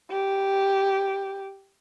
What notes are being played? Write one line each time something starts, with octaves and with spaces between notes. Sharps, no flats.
G4